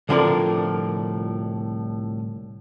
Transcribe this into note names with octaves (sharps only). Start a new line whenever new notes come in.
C2 A2 D3 F3 A#4 D5